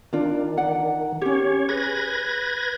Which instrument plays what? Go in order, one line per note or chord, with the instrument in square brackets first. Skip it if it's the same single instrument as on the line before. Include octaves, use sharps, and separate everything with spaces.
[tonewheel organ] D#3 [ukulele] D4 F4 D5
[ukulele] D5 F#5
[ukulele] C#4 G4 [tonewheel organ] C#5
[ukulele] G#4 [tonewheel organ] B4 G#6 A#6